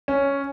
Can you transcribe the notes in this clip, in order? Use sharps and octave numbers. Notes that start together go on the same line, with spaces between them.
C#4